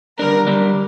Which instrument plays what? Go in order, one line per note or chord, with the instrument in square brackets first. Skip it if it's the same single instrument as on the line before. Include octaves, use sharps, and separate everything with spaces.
[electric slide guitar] D3 G3 D4 [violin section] A#4
[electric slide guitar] D3 G3 D4